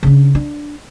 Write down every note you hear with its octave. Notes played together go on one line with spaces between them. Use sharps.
C#3 D4
D4